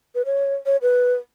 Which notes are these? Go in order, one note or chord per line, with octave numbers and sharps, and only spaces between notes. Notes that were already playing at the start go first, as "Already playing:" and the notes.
B4
C#5
C#5
B4